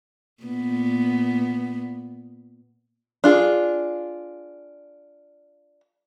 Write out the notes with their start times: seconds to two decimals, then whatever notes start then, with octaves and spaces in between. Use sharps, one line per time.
0.43 A#2 B3
3.24 D4 F4 G#4